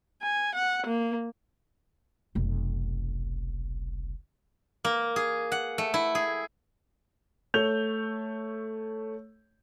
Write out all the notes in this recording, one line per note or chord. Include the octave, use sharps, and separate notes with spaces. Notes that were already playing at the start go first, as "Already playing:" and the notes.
G#5
F#5
A#3
F1 B1
A#3
G#4
F#5
A3
E4
G#4
A3 C#5 G6 F7